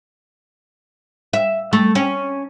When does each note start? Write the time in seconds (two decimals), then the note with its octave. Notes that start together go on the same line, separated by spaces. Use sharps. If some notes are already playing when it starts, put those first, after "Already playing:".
1.33 E5
1.73 A3
1.95 C#4